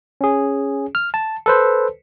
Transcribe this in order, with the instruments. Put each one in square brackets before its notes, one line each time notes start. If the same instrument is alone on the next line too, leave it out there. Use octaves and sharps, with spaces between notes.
[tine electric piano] C#4 G#4
F6
A5
A4 B4 C5